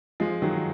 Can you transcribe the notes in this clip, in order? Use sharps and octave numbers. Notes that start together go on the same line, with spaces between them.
F3 G#3
D#3 F#3